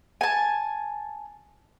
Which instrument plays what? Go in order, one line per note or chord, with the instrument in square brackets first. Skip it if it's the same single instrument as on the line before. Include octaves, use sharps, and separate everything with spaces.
[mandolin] G#5 A5